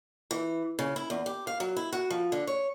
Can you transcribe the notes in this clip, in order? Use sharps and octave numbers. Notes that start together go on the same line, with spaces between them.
E3
C#3
E4
E2
G4
F5
F#3
E4
F#4
F3
D3
C#5